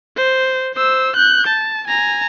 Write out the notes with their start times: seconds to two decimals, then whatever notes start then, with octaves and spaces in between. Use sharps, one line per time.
0.17 C5
0.74 C5 E6
1.16 F#6 G6
1.47 A5
1.88 G#5 A#5